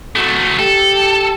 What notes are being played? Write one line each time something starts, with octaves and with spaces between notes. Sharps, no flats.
F#3 A3
G4 A4